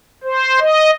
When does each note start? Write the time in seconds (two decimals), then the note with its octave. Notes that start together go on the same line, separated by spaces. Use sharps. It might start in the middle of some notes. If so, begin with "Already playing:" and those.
0.24 C5
0.60 D#5